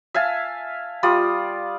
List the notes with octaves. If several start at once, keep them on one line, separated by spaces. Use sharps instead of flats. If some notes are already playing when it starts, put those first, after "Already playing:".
E5 F5 G#5 A5
G3 F4 D5 D#6